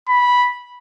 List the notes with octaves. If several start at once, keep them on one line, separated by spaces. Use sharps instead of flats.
B5